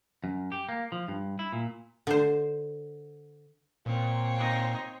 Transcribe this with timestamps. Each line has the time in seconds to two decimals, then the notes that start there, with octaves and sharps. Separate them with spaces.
0.24 F#2
0.52 G4
0.69 A#3
0.92 F3
1.08 G2
1.39 E4
1.53 A#2
2.07 D3 C5
3.86 A#2 C4 C#5
4.38 D#4 D#5